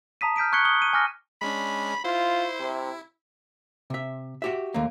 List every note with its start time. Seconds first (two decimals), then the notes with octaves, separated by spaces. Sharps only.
0.21 A5 A#5 D#6 B6 D#7
0.36 F6 G6 B6 D7 D#7
0.53 C#6 F#6 G#6 B6 C#7 G7
0.65 D#6 G7
0.82 D#7
0.93 G#5 D6 F6 A#6
1.42 G#3 C#4 D4 B5
2.04 E4 F4 C5
2.60 C3
3.90 C3 E5
4.42 F#4 G4 E5
4.74 D#2 A3 A#3